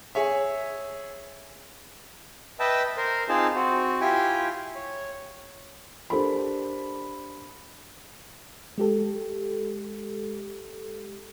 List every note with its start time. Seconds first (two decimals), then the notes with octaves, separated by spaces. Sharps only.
0.15 G#4 C#5 E5
2.60 B4 D#5 E5 G5 A5
2.97 A#4 C5
3.29 C4 D#4 F4 G#4 A5
3.55 C4 F#4
4.01 E4 F4 G4 G5 G#5
4.75 C#5
6.10 D4 G4 A4 A#4 C5 B5
8.78 G#3 G4 A4